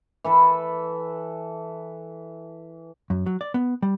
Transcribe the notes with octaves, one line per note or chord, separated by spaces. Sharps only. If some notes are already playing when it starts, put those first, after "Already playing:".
E3 A4 B4
F#2
F#3
D5
B3
G3